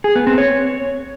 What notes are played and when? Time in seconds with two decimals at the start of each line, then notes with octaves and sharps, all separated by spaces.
0.04 G#4
0.15 B3
0.27 C4
0.38 C#5